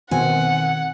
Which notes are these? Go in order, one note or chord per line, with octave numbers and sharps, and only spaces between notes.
B2 D#3 C4 F#5 G#5